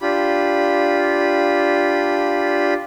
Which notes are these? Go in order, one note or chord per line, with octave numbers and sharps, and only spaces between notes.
D4 F4 G4 B5